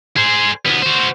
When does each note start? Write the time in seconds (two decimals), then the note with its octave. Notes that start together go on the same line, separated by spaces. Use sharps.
0.17 G#4 C5
0.66 D2 B3
0.82 F#4 C5